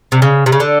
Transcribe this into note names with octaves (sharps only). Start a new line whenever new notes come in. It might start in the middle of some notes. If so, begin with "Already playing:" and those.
C3
C#3
C3
C#3
D3